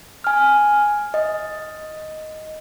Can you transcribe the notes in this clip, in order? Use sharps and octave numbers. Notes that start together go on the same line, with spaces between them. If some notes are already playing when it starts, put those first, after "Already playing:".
G#5 F6
D#5